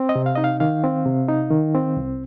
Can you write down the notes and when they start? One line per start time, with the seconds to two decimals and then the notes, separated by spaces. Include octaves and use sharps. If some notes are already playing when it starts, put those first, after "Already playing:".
Already playing: C4
0.09 D#5
0.16 C3
0.26 F5
0.35 D#4 D#5
0.44 F5
0.60 D#3 F5
0.84 C4
1.05 C3
1.29 D#4
1.51 D#3
1.74 C4
1.97 C2